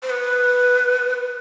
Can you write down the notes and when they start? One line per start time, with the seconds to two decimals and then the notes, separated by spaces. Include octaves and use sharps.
0.03 C5
0.10 B4